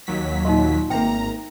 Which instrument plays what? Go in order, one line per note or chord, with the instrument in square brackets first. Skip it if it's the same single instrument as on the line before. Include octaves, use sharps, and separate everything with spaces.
[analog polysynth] D#2 F#3 B6
[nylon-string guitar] A#2 D#5 [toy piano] D#4 C6
[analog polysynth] G#1 A#5 [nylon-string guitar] A#3 C4 [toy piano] E5 G5